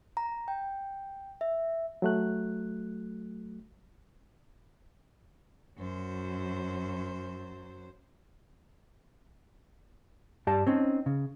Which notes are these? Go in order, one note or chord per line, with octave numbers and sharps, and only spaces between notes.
A#5
G5
E5
F#3 A3 F#6
F#2 F#3 C5
G2 G4 D5 A5
C4 C#4 D#4
C#3